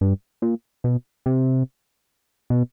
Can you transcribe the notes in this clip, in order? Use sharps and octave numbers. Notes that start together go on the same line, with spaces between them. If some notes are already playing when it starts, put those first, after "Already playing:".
G2
A#2
B2
C3
B2